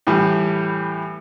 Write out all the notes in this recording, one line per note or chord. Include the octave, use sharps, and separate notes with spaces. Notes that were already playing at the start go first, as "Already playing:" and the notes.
A2 E3 G3